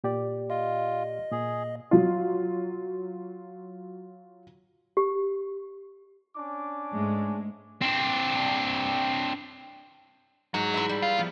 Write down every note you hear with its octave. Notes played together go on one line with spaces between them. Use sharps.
A#2 G4 D5
F4 D#5
A#2 G#4
F#3 F4
G4
C#4 D4 D6
G#2 G#3 A3
C4 D4
G#2 F#3 G#3
E4 B4 E5
G3
F4
F3 B3